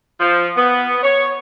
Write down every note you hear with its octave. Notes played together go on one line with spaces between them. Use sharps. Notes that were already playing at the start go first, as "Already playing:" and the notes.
F3
B3
C#5